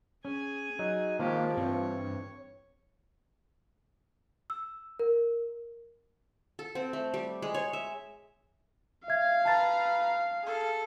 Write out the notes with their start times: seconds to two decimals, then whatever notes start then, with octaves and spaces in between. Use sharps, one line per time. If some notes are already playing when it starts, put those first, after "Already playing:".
0.25 C#4 G#4 G#5
0.79 F#3 D#4
1.19 D#3 F3 G#3 A#3 G4 C#5
1.57 G2 E3 C4 C#5
4.50 E6
4.99 A#4
6.59 A4
6.75 C4
6.93 A3
7.14 G3
7.42 G#3
7.55 C#5
7.73 E5
9.08 E5 F5 G#6
9.45 B4 A5 A#5 A6
10.44 G#4 A4